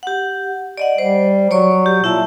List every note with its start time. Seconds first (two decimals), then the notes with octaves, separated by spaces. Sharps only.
0.03 G4 F#5
0.78 D5 D#5 F#5
0.98 G3 C5
1.51 F#3 C#5 D5 C#6
1.86 G4
2.04 A#2 E4 E5 A5